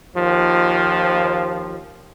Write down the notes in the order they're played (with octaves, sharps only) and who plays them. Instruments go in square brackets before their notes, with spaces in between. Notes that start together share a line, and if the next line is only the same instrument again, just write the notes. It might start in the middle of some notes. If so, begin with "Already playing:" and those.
[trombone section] D#2 F3